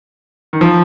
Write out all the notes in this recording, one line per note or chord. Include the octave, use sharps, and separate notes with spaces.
D#3
F3